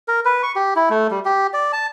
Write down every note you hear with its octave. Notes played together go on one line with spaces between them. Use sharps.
A#4
B4
C#6
G4
E4
A3
G3
G4
D5
A5